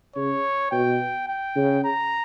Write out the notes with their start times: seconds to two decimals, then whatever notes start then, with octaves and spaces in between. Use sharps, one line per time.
0.16 C#3 C#5
0.72 B2 G5
1.28 G5
1.56 C#3
1.84 A#5